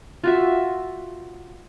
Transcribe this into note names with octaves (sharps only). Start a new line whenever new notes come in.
F4 F#4 E5